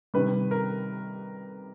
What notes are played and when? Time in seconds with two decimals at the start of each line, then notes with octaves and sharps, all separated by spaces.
0.14 C3 D#3 G3 B4
0.51 A#4